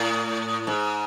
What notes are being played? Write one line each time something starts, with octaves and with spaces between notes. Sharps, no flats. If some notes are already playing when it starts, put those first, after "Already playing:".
Already playing: A2
G#2